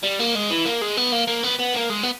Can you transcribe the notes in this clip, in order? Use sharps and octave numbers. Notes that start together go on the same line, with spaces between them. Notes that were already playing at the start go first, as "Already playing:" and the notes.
G3
A#3
G#3
E3
A#3
G#3
B3
A#3
A#3
B3
B3
A#3
G#3
B3